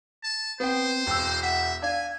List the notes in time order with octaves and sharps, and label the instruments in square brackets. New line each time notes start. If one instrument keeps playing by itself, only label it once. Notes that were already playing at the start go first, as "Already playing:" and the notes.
[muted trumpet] A5
[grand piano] B3 G5 [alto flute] C4 [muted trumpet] C5
[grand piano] E1 E6 [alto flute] G5
[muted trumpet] E5 [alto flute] F#5
[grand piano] D4 [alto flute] F5 [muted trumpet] G#5